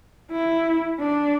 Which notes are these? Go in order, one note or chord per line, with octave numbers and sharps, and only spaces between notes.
E4
D4